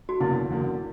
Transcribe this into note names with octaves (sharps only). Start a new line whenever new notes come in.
F#4
F#1 E2 D3 A#3 E4
F#1 E2 D3 A#3